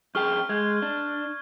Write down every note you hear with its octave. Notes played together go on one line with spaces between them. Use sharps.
F2 G#4 G5 C#6 F6 G7
G#3 G6 G#6
D4